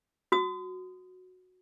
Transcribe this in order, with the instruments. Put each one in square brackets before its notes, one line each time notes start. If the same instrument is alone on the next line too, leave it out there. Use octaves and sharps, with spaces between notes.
[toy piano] F#4 D#6